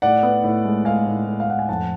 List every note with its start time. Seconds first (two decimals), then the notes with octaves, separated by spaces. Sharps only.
0.02 A2 D5 F#5
0.23 B3
0.44 A2
0.64 G#3
0.85 G#3 F5 G#5
1.07 A2
1.27 A2
1.40 F5
1.48 A2 F#5
1.59 G#5
1.69 F2 F#5 A5